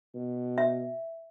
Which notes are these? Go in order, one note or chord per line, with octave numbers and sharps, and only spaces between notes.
B2
E5